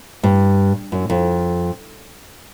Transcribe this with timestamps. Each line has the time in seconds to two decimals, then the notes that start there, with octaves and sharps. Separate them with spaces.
0.23 G2
0.92 F#2
1.10 F2